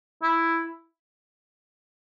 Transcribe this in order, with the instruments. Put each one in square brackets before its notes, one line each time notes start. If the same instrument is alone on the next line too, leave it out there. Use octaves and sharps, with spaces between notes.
[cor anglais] E4